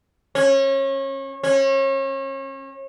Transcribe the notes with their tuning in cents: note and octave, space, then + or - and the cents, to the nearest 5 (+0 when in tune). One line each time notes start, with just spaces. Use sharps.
C#4 -30
C#4 -35